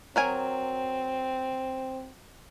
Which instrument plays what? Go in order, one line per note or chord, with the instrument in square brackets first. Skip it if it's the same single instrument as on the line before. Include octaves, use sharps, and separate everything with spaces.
[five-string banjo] F#3 A#4 G#5 [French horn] C4